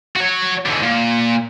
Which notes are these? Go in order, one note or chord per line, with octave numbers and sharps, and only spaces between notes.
F#4 C#5
G#2 D3
A#2